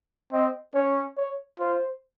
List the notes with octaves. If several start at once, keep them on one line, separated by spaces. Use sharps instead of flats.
C4 D#5
C#4 C#5
C#5
F4 C5